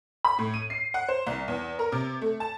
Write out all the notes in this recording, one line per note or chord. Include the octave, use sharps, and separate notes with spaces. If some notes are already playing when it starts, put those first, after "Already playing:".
B5
A2
D#7
C7
F#5
C5
C2
E2
A#4
C3
A3
A5